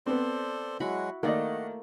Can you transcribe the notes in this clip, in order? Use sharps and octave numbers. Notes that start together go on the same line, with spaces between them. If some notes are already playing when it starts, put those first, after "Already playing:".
B3 C4 A4 C5 D5
F#3 G#3 E4 F#4 F#5 B5
D#3 A3 A#3 D5 D#5 F#5